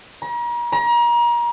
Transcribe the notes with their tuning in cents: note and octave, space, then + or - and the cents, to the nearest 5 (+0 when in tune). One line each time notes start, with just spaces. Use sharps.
A#5 +40
A#5 +35